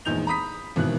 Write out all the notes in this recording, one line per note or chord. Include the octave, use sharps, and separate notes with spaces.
A#1 E2 G#3 D#4 G6 F7
A#5 B5 D#6 B6
G#1 B2 D#3 E3 F#6